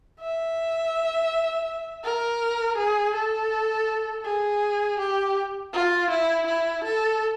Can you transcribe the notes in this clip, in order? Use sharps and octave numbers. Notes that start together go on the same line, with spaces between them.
E5
A#4
G#4
A4
G#4
G4
F4
E4
E4
A4